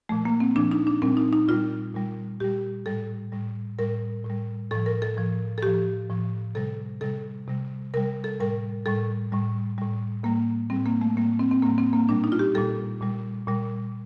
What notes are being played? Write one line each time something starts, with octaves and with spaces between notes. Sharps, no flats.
A#2 F3 A3
A#3
C4
A#2 F3 D4
D#4
D4
A#2 G3 C4
D#4
D#4
A#2 G3 F4
A#2 G3
A#2 G3 G4
A2 G3 A4
A2 G3
A2 G3 A#4
A2
G3
A2 F3 A4
A#4
A4
A2 F3
A4
A2 F3 G4
A2 F3
C3 G3 A4
C3 G3 A4
C3 G3
C3 G3 A#4
A4
A2 G3 A#4
A2 G3 A4
A2 G3
A2 G3
A2 G3 A#3
A2 G3 C4
A#3
A3
A2 G3 A#3
C4
C4
A2 G3 A#3
C4
A#3
A#2 G3 D4
D#4
F4
G4
A#2 G3 A4
A#2 G3
A#2 G3